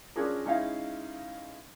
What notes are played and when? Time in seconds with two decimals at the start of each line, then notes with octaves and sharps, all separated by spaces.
0.16 C#4 D4 F4 G#4 A#4
0.45 G#3 C#4 D#4 E4 E5 F5